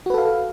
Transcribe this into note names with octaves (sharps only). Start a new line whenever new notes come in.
F#4 A4 B4 F5